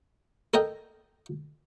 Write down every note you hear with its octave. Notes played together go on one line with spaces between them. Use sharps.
A4 A#4 D#5 G5